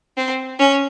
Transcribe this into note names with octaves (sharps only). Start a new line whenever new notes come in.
C4
C#4